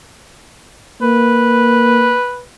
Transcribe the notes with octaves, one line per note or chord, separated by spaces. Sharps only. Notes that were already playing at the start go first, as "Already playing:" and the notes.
A#3 B4